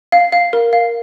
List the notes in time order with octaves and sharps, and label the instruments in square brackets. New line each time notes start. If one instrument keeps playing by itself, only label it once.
[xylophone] F5
F5
A#4
F5